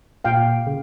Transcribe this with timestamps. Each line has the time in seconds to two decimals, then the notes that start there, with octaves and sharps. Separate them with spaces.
0.24 A#2 F5 G5
0.67 C#3